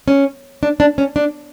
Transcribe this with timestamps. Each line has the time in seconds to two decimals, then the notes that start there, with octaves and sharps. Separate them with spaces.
0.08 C#4
0.63 D4
0.80 D4
0.98 C#4
1.16 D4